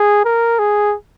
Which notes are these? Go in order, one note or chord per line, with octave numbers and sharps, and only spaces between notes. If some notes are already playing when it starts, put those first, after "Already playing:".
Already playing: G#4
A#4
G#4